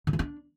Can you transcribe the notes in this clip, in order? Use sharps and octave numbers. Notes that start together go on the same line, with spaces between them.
D3
E3
D4